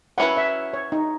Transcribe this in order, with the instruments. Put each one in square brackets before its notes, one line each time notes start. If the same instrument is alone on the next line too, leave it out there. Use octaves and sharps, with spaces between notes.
[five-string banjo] F#3 C#4 E4 B4 [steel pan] F#5
[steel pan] E5
C#5
D#4